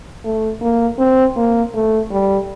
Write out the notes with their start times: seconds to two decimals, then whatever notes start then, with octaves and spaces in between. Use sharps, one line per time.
0.24 A3
0.61 A#3
0.99 C4
1.36 A#3
1.74 A3
2.11 G3